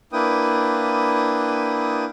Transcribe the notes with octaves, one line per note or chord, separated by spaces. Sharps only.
A#3 D4 E4 B4 G5 D#6